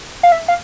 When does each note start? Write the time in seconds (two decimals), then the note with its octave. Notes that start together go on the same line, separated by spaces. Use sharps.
0.23 F5
0.32 E5
0.48 F5